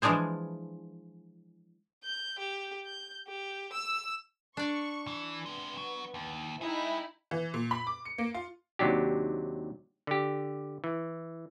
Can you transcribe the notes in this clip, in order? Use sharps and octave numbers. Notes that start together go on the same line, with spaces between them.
E3 F3 G#3 D4 G#4 C5
G6
G4
G6
G4
E6
D4 D5 C#6
E3
C3 G#3 B3
F#3
D#2
D#4 E4 G#4 D#5 G5
E3
A#2
B5
D6
C#7
A#3
F4
D#2 C3 F#3 D4 G4
D3 G4
E3